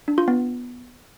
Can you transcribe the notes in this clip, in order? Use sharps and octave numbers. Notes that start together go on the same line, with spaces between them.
D4
F4
B3